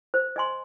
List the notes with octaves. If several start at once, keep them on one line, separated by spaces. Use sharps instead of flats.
C5
D#5 G#5 C6